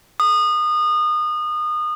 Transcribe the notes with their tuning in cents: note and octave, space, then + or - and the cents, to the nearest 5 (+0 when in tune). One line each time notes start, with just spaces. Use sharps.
D#6 -30